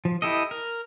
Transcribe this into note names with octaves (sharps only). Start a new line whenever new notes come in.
F3
E4 G4 A4 D#5
A#4